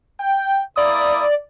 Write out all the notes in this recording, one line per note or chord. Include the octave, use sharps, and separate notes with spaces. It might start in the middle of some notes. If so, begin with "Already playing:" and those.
G5
A#3 E4 D5 D#6